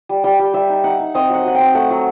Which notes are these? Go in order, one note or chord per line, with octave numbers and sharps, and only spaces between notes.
G3
G3 G5
G3
G3 E5
D#4
D#4 F#5
D#4
C4 D#5
F#3 F#5
F#3 F#5
C4 G5
A3 F#5
F#3